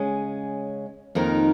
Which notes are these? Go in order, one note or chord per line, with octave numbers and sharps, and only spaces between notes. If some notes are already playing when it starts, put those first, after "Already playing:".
Already playing: C#3 G#3 C#4 G#4
F2 D#3 A#3 D#4 A#4